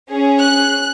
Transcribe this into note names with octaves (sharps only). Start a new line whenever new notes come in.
C#4 G#4
F#6